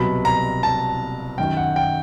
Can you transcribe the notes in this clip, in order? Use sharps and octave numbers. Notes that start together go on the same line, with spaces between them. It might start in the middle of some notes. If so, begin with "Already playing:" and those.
Already playing: C2 B2 F#3 B5
A#5
A5
F#2 D#3 F#3 G5
F#5
G5